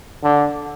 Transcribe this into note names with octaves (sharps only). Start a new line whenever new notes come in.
D3